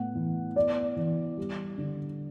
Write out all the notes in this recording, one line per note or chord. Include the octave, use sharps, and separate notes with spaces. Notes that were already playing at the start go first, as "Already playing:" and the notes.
Already playing: A2 B3 F#5
E3
B3 D5
E3
G3
D3